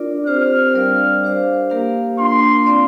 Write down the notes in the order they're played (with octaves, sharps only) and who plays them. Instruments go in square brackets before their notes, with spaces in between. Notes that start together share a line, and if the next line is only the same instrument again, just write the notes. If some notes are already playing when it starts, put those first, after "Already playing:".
Already playing: [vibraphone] D4 F4 A#4 D5
[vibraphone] C4 G4 C5 [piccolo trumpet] F6
[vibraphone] G3 D4 A#4 D5 F5
D4 G4 C5 F5
A#3 G4 A#4 F5
[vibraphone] A#3 D4 F4 [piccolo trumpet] C6
[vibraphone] C4 F4 D5 F5